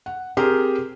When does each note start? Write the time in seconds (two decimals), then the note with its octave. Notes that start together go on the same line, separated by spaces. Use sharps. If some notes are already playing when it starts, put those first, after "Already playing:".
0.06 F#5
0.37 C4 G4 G#4 A#4 C5